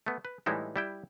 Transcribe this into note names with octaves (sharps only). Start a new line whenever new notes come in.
A3 B3
B4
A2 E3 G3 G#3 D#4 E4
G3 E4 G5